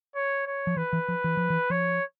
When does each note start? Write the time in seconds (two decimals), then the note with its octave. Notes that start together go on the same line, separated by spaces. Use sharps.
0.15 C#5
0.47 C#5
0.67 F3
0.77 E3 B4
0.93 E3
1.08 F3
1.24 E3
1.37 F3
1.50 E3
1.70 F3 C#5